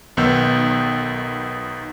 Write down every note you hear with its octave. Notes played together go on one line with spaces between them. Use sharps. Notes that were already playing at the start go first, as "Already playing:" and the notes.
B1 D#3 B3 E6 G6